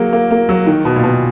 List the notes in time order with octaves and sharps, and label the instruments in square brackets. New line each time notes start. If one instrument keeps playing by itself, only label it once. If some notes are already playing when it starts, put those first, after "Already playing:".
Already playing: [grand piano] F#3 A#3 [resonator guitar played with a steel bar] G#4
[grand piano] A#3
A#3
F#3
D#3
B2
A#2
B2